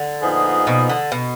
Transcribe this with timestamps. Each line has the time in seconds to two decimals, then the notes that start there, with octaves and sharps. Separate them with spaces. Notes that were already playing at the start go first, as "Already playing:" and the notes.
Already playing: D3
0.21 A#2 F3 B3 D#4 G#4
0.67 B2
0.89 D3
1.12 B2